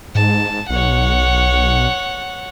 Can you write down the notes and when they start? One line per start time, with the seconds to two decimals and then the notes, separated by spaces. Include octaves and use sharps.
0.15 G#2 A5
0.70 B1 C#5 F#5